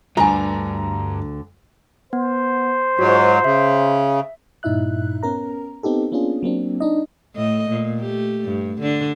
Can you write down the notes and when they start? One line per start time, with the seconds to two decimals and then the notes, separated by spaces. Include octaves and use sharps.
0.17 D2 G2 D3 F4 G#5 A#5
2.13 B3 C5
2.99 G#2 F#3 F4 F#4
3.44 C#3 E5
4.63 G2 A#2 D#4 E4 E5 F#6
5.23 B3 C#4 A#4 A#5
5.83 B3 C4 D#4 G4 A4
6.12 A#3 B3 C#4 D4 F4 G#4
6.43 F#3 A#3 C4 D4
6.80 D4 D#4 D#5
7.35 A2 A3 D#5
7.70 A#2
7.99 A3 G4
8.45 G2
8.81 D3 D4